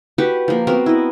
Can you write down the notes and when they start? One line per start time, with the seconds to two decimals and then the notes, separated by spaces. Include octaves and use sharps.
0.18 F#4 G4 B4 C#6
0.48 F3 A#3
0.67 B3 C4 F#4 A#4
0.86 E4 D#5